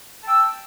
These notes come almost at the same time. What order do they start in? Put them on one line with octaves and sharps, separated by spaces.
A5 G5 E6